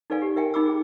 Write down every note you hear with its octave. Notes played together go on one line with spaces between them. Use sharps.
D#4 A4 B4 D5 F5 G#5
G4
A#4 E5 G5 G#5
D#4 B5 D6 E6
G#4 G5